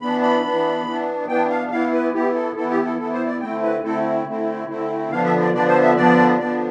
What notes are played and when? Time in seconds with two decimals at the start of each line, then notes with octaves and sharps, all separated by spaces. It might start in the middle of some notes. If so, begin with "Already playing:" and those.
0.01 E3 B3 D4 B5
0.22 B5
0.44 E3 B3 D4
0.86 E3 B3 D4
1.28 E3 B3 D4 G5
1.50 F5
1.71 E3 B3 E4 F5
1.92 B4
2.14 E3 B3 E4 G4
2.35 A4
2.56 E3 B3 E4 A4
2.70 G4
2.85 A4
2.99 E3 B3 E4 A4
3.13 C5
3.27 D5
3.41 D3 A3 C4 E4 G5
3.63 B4
3.83 D3 A3 C4 E4 A4
4.27 D3 A3 C4 E4
4.68 D3 A3 C4 E4
5.11 D3 F3 B3 D4 F5
5.25 E5
5.40 D5
5.54 D3 F3 B3 D4 D5
5.68 C5
5.82 E5
5.96 D3 F3 B3 D4 D5
6.38 D3 F3 B3 D4 D5